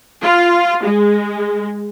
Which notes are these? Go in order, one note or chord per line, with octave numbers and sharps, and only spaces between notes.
F4
G#3